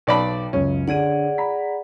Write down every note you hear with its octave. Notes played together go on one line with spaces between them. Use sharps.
B1 D5 G5 A5 B5
C#2 F#2 C#3 C#4
D3 G#4 D5 F#5 D#7
A#5 B5 B6